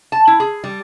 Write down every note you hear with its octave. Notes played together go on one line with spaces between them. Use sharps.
A5
E4
G#4
G3